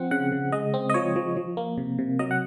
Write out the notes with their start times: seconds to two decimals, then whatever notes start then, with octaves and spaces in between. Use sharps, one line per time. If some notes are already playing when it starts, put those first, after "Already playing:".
Already playing: F3 C4 F#5
0.11 C#3 F#5
0.32 C#3
0.52 G#3 D#5
0.74 C4
0.90 D#5
0.94 F3 C#5
1.16 F3
1.37 F3
1.57 A#3
1.78 C3
1.99 C3
2.19 F#3 D#5
2.31 F#5